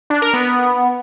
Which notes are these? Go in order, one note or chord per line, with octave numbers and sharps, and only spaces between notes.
D4
A#4
B3